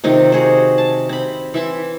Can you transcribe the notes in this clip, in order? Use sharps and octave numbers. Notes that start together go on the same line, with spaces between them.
C3 D#3 C4 F4
F#4 G#4 C5
A5
C4 B5
E3 E5 C6